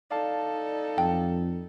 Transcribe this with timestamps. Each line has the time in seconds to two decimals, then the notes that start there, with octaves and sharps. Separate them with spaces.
0.10 D#4 A4 D5 F5 A5
0.98 F2 G5